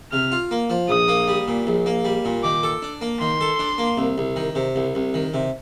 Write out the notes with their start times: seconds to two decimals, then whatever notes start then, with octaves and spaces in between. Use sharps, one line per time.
0.12 C3 F6
0.32 F4
0.51 A#3
0.70 F3
0.89 A#1 D#6
1.08 A#3
1.28 G3
1.48 A#2
1.67 A#1
1.86 A#3
2.05 G3
2.25 A#2
2.43 D#3 D6
2.63 A4
2.82 D4
3.01 A#3
3.20 D#3 C6
3.41 A4
3.59 D4
3.78 A#3
3.97 C2
4.18 C2
4.36 D#3
4.55 C3
4.76 C2
4.95 C2
5.14 D#3
5.34 C3